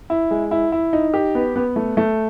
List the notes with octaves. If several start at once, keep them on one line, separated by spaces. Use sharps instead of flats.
E4
G#3
E4
E4
D#4
G4
B3
B3
A3
A3